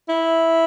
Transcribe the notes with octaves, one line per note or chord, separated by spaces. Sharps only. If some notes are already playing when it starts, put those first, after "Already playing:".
E4